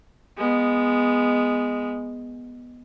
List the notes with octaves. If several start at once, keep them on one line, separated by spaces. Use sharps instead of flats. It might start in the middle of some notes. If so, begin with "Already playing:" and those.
G#3 B3